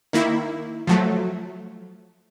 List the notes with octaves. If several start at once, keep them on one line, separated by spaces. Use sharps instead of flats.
D#3 A#3 E4
F3 F#3 A3